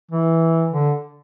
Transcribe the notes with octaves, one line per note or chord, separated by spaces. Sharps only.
E3
D3